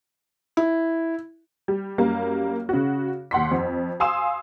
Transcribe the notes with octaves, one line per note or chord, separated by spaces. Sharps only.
E4
G3
F#2 G3 A#3
C#3 F#4
D#2 F#5 C6 B6
F2
F5 G#5 C6 D#6 E6 E7